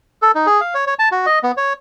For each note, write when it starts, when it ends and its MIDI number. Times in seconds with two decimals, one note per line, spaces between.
0.22 0.32 69
0.35 0.46 63
0.47 0.61 68
0.61 0.74 77
0.74 0.85 73
0.87 0.94 73
0.99 1.09 81
1.12 1.26 66
1.26 1.39 75
1.43 1.52 59
1.57 1.73 73